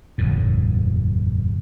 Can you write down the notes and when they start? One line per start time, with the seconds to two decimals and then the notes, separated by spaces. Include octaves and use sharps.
0.18 F#1 E2 A2